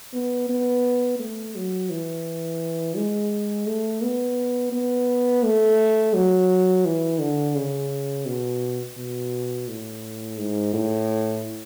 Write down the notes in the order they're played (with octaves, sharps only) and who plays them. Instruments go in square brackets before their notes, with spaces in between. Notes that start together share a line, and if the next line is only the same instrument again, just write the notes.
[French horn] B3
B3
A3
F#3
E3
G#3
A3
B3
B3
A3
F#3
E3
D3
C#3
B2
B2
A2
G#2
A2